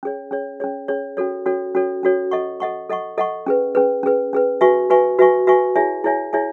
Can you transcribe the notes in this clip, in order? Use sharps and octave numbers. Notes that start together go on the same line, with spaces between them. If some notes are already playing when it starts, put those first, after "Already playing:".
C#4 G#4 C#5
C#4 G#4 C#5
C#4 G#4 C#5
C#4 G#4 C#5
C#4 F#4 A4 C#5
C#4 F#4 A4 C#5
C#4 F#4 A4 C#5
C#4 F#4 A4 C#5
A4 D#5 F#5 C#6
A4 D#5 F#5 C#6
A4 D#5 F#5 C#6
A4 D#5 F#5 C#6
C#4 G#4 B4
C#4 G#4 B4
C#4 G#4 B4
C#4 G#4 B4
F#4 B4 E5 G#5 C#6
F#4 B4 E5 G#5 C#6
F#4 B4 E5 G#5 C#6
F#4 B4 E5 G#5 C#6
E4 G#4 C#5 E5 G#5
E4 G#4 C#5 E5 G#5
E4 G#4 C#5 E5 G#5